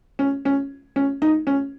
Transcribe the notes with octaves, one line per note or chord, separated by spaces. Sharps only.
C#4
C#4
C#4
D#4
C#4